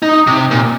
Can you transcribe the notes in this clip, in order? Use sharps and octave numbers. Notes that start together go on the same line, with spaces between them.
D#4
C3
A#2